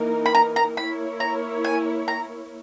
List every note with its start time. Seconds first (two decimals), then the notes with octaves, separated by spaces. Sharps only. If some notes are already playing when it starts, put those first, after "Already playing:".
Already playing: E3 A#3 D#4 A#4
0.26 B5
0.35 A#5
0.56 A#5
0.77 A#3 E4 A#4 C#5 B5
1.20 A#5
1.65 G#5
2.08 A#5